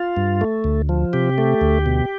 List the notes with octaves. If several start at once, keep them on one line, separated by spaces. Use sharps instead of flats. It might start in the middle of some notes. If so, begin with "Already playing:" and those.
Already playing: F4
G2
A3
D2
F3
C3 G4
A3
D2
B2